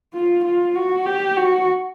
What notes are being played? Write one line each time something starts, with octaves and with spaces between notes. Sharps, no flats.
F4
F4
F#4
G4
F#4